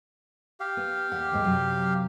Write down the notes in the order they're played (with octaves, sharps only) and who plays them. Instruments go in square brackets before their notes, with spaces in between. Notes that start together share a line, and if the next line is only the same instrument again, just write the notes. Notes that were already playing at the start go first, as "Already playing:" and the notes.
[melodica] G4 F5
[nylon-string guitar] B3
D#2 E5 F#5
D#2 G#2 G#3
F#2 C3 F#3